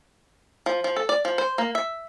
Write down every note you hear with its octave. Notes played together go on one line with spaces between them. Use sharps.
F3
F3
A4
D5
F3
C5
A#3
E5